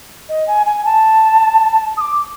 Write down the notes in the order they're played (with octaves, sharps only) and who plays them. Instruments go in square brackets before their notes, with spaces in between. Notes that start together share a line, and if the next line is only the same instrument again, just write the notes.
[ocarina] D#5
G#5
G#5
A5
D#6
D6